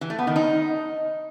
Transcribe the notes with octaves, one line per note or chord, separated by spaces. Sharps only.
E3
A3
B3
D#3
D#4